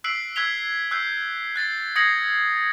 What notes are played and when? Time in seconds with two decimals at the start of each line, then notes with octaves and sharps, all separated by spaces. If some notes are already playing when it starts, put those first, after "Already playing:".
0.04 E6 F#6 B6 C7 D7 F#7
0.36 E6 F#6 G#6 B6 F7 G7
0.91 E6 F#6 G6 C7
1.56 F#6 A6 C7
1.96 D#6 G#6 A#6 C7 C#7 F#7